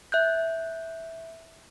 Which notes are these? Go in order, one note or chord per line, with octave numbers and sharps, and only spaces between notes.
E5 F#6 G6